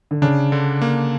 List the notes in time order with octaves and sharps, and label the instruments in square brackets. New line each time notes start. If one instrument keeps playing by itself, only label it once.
[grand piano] D3
[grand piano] C#3 [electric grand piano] D4
[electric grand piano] D3
A#3